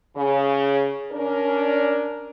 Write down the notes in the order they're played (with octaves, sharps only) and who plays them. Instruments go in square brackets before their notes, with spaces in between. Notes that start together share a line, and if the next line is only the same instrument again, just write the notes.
[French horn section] C#3
C#4 D4 A#4